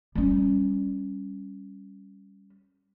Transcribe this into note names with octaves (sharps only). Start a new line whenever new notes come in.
G3 C#4